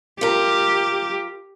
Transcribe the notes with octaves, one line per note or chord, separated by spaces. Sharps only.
F4 G4 A#4